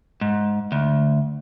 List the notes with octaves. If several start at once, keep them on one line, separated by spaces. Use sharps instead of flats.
G#2
D2